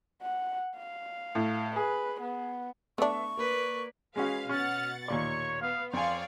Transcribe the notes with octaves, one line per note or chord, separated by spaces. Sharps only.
F#5
F5
A2
G#4 B4
B3
A3 B3 D4 E5 C#6
A#3 B4 D5
G#3 C#4 F#4 G#4 B4 F5
B2 C#4 F#5 F6 A6
D#2 A#2 C#5 D5 C#6
B3 F5
F2 C#5 D5 F5 G#5 C6